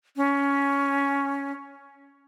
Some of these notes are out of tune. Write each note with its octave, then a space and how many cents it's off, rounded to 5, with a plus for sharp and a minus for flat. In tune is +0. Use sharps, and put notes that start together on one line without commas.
C#4 +10